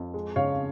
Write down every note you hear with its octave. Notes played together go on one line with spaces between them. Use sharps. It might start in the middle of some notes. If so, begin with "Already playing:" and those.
Already playing: F2
G#3
C#3 C#5 F5